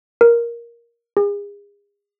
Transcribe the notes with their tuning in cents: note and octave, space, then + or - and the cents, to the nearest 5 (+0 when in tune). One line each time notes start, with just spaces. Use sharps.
A#4 +10
G#4 -35